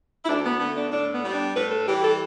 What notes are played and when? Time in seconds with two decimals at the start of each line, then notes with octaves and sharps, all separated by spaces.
0.24 E4
0.28 D2 D4
0.44 B3
0.60 D3 A3 B3
0.76 D4
0.91 A2 D4
1.14 B3
1.24 G3
1.34 D4
1.55 A2 B4
1.71 A4
1.88 E3 G3 G4
2.04 A4